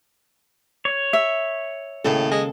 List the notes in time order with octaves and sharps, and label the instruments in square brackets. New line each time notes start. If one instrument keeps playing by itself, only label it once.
[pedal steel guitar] C#5
[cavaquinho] E5
[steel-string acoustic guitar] D#2 C#3 A4 [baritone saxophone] A2
[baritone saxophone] G#3